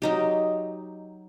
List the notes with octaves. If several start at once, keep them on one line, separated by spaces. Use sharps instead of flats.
F#3 D#4 G4